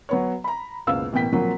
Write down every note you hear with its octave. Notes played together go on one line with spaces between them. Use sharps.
F#3 B3 C#5
A#5 B5
F#1 C#2 B2 B3 F5 E6
A1 B2 A#3 G5 B6
A#2 F3 F#3 A#3 C4